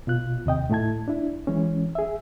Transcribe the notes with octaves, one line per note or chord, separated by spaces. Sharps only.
B2 F4 F#6
D#2 C3 D#5 G5
A2 A3 E4 A5 G#6
D4 E4
E3 G#3 C#4
G#4 E5